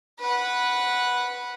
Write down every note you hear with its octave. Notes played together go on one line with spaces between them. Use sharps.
B4 F#5